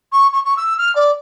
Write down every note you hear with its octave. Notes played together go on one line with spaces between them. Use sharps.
C#6
C#6
C#6
E6
F6
D5